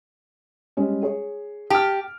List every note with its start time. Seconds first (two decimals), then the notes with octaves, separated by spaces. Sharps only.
0.77 G3 G#3 C#4
1.03 G#4 C#5
1.70 G4 A5 F6